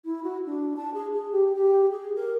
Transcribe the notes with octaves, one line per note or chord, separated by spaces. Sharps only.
E4
F#4
D4
A5
G#4
G#4
G4
G4
G#4
A#4